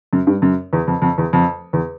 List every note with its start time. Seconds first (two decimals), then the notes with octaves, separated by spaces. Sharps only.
0.13 F#2
0.27 G2
0.42 F#2
0.73 E2
0.88 F2
1.02 F2
1.18 E2
1.33 F2
1.73 E2